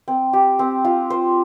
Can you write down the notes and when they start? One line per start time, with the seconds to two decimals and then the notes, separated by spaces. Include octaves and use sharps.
0.08 C4
0.33 G4
0.59 C4
0.85 F4
1.10 C5